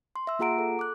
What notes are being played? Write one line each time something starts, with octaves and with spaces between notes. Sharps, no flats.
C6
E5 E6
A#3 F4 G#4 F#5 A#5 D7
A4
D6 F#6